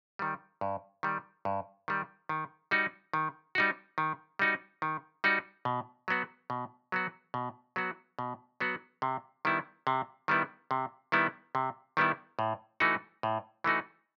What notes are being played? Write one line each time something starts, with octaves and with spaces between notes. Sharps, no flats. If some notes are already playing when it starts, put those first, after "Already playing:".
D#3 G3
G2
D#3 G3
G2
D#3 G3
D#3
G3 D#4 F#4
D#3
G3 D#4 F#4
D#3
G3 D#4 F#4
D#3
G3 D#4 F#4
B2
F#3 B3 F#4
B2
F#3 B3 F#4
B2
F#3 B3 F#4
B2
F#3 B3 F#4
C3
D#3 G3 B3 E4
C3
D#3 G3 B3 E4
C3
D#3 G3 B3 E4
C3
D#3 G3 B3 E4
A2
E3 A3 D#4 F#4
A2
E3 A3 D#4 F#4